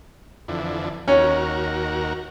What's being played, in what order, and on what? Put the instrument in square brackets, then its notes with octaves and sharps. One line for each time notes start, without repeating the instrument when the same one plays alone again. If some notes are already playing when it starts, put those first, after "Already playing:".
[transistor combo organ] F2 D3 E3
[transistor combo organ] D#2 F#4 A#4 [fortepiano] C#4